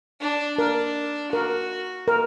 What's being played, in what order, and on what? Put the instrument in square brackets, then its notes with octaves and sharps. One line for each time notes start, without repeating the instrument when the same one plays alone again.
[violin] D4
[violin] D4 [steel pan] A#4
[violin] F#4 [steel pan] A#4
[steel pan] A#4